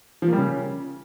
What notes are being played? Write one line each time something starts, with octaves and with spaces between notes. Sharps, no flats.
F3
A#3
G3
C#3